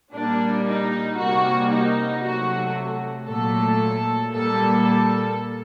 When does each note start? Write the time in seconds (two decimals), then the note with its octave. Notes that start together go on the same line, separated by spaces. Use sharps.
0.13 A#2 G3 A#3 D4
0.66 D#4
1.18 C3 G3 A#3 F#4
1.71 D#4
2.23 C3 F#3 A3 F#4
3.27 A#2 F#3 A3 A4
4.32 A#2 G3 A#3 A4
4.85 A4